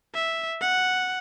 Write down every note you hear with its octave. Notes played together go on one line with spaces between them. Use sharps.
E5
F#5